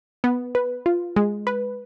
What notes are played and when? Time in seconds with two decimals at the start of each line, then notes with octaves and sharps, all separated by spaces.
0.24 B3
0.55 B4
0.86 F4
1.16 G#3
1.47 B4